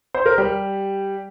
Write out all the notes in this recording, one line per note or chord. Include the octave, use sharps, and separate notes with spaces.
C5
A#4
G3 G4